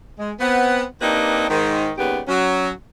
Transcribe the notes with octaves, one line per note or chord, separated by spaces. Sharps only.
G#3
B3 C4 F#5
A#3 C4 D4 D#4 G4 B4
G#2 D#3 D#4
D#2 C#3 G3 B3 G4
F#3 C#4